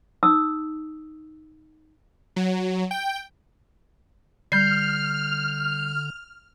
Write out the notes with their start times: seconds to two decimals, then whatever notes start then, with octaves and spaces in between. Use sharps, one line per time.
0.23 D#4 D#6 E6
2.36 F#3
2.91 G5
4.52 D3 G3 F6 G6 C7